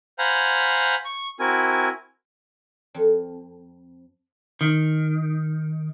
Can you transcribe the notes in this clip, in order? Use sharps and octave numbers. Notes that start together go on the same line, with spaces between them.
C5 F5 F#5 G#5 A#5 B5
C#6
C4 E4 F#4 A#4 G#5
F2
D#3